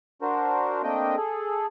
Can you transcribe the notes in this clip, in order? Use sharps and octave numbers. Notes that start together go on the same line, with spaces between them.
D4 F#4 A#4 C5
A3 A#3 C4 D4 D#5 G5
G#4 A4